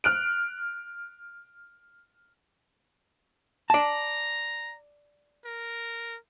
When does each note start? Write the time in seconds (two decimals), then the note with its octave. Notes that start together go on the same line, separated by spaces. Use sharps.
0.04 F6 F#6 D7
3.70 D5 A5 A#5
5.45 A#4